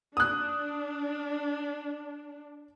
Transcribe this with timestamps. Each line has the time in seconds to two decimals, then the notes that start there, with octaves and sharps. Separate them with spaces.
0.17 D4 D#6 F#6